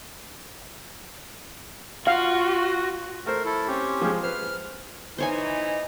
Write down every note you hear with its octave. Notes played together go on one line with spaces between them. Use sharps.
F4 F#4 F5
A3 A#4 C5
E4 A4
C4 C#4 G4
F3 G#3
B4 C5 F6
E3 D#4 C5 C#5 G#5